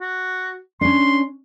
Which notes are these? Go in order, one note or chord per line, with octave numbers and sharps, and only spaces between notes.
F#4
C#4 D4 C6